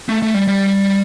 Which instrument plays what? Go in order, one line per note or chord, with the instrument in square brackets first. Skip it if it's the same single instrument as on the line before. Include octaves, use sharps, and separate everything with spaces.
[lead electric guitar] A3
A3
G3
G3